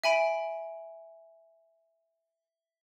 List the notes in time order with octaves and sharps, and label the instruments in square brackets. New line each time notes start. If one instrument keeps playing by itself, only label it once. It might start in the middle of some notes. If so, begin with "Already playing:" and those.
[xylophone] E5 G#5 B5 D7